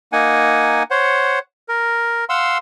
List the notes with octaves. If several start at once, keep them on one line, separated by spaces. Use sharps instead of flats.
A#3 D#4 F#5 G#5
C5 C#5 F#5
A#4
F5 F#5 C6 E6